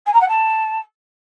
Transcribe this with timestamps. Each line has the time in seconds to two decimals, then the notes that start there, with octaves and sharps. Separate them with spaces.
0.06 G#5
0.13 A#5
0.21 F#5
0.28 A5